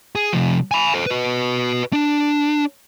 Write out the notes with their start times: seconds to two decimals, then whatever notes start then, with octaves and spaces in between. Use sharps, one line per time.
0.15 G#4
0.33 C3 F3
0.71 G#5 B5
0.94 A4 C5
1.06 F#4 B4
1.93 D4